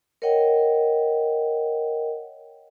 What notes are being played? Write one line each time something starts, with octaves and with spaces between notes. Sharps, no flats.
A#4 C#5 D#5 F#5 G5